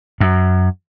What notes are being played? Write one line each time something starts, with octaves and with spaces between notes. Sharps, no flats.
F#2